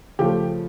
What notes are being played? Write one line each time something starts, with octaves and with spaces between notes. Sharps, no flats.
C#3 F3 A3 G4